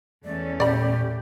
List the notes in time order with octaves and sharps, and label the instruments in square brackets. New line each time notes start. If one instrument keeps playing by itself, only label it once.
[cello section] E2 A3 C#4 [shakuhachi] D5
[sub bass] A#2 [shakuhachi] G4 [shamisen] D5 B5